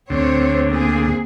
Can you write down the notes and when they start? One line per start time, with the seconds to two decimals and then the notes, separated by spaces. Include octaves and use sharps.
0.10 D2 C4 C5 C#5
0.68 A#3 C4 G#4